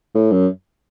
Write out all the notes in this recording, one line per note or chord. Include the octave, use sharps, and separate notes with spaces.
A2
F#2